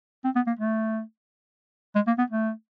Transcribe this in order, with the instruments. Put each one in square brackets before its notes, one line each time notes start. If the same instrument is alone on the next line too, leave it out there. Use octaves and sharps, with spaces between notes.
[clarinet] C4
B3
A#3
A3
G#3
A#3
B3
A3